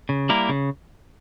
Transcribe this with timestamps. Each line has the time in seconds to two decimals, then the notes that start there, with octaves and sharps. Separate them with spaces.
0.09 C#3
0.29 G3 A#3 E4 A#4
0.49 C#3